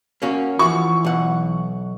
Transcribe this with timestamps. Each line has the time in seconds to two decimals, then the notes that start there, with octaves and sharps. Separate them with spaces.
0.22 A#3 C#4 F#4
0.59 E3 F3 F#4 C#6
1.05 B1 F#5